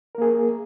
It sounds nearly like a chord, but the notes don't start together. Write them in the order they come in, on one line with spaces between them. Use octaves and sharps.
A#4 A#3 G#4